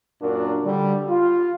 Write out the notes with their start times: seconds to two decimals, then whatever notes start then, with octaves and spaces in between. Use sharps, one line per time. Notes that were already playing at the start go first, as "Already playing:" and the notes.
0.22 F#2 A#2 D4 F#4 A#4
0.63 D3 G3
1.09 F4